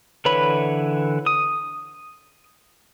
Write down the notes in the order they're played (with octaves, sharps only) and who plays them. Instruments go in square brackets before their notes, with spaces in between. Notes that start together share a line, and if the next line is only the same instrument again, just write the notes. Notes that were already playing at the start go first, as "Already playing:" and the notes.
[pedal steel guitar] D3 E3 B4 C#5 B5
D#6